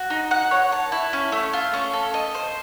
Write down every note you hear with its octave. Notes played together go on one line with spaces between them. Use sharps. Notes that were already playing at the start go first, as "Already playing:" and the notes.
Already playing: F#4
D#4
F#5
C#5
A5
E4
C#4
A3
F4
C#4
A4
D#5
C5